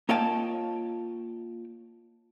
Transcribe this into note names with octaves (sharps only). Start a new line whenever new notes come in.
A#3 F4 C#5 D#5 G5 A5